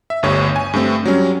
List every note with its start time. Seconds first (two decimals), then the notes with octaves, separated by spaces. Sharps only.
0.10 E5
0.23 G1 D2 G2 C#5
0.56 G#5
0.73 G2 A3 C4
1.05 F#3 G3 C#4